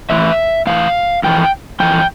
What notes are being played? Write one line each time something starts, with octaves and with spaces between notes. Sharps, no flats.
A2 E3 E5
A2 E3 F5
F2 E3 G5
F2 E3 G5